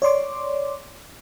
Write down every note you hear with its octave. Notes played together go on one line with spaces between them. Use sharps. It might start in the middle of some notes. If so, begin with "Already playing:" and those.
C#5 D5 C6 D6